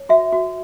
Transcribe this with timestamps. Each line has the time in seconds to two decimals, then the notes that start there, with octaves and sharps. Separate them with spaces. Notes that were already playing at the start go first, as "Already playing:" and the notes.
Already playing: C#5
0.09 F#4 E5
0.32 F#4